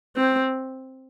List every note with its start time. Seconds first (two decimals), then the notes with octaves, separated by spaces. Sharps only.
0.17 C4